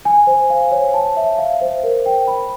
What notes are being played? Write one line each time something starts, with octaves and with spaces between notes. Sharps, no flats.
G#5
C5
F5
C#5
A5
E5
F5
C5
A#4
G5
B5